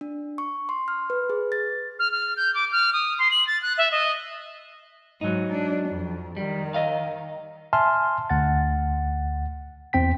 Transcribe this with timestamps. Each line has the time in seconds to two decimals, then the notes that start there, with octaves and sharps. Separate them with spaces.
0.01 D4
0.38 C#6
0.69 C6
0.88 F6
1.10 B4
1.30 G#4
1.52 A6
1.99 F6
2.12 F6
2.37 G6
2.55 D6
2.72 F6
2.93 D#6
3.19 C6
3.31 F#7
3.47 A6
3.62 F#6
3.78 E5
3.92 D#5
5.21 G#2 F#3 D#4
5.52 D4
5.89 F2
6.37 D#3 G3
6.74 D#5 F5
7.73 E5 G#5 A5 C6 F6
8.30 D2 F#5 A6
9.93 E2 C4 G5 B6